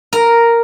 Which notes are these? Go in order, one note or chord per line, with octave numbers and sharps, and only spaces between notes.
A#4